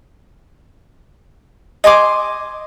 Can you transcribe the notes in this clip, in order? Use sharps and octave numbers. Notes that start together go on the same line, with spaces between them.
D#5 G#5 C6 D6